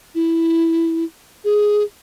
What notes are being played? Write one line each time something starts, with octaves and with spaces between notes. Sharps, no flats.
E4
G#4